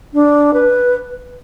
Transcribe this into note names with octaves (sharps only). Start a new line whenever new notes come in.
D4
B4